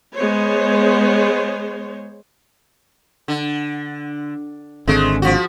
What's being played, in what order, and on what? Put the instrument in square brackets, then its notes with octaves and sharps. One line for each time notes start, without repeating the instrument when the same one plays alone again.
[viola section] G#3 B3 C5 C#5
[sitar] D3
[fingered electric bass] G#1 D3 C4 [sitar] G#3 A3
[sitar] F3 F#4